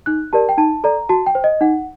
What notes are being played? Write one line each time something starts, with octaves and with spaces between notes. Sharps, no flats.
D#4 F#6
G4 A#4 D5 A5
G5
D#4 A5
A4 D5 A#5
F#4 A5
G5
C5
D#5
D#4 F#5